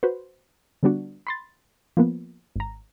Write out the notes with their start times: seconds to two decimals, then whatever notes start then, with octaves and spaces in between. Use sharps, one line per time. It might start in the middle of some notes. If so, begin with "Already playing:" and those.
0.03 F#4 B4 C5
0.83 D3 G3 B3 D4 F#4
1.27 B5 C6 A6
1.97 F3 A#3 B3
2.56 G#1 A#5